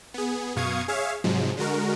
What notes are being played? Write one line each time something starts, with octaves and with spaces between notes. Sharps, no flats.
B3 G#4
F#2 B2 F5 C#6 D#6 G#6
G#4 C#5 E5 F5
G#2 C3 F3 F#3 G#3
D3 G#3 F#4 A#4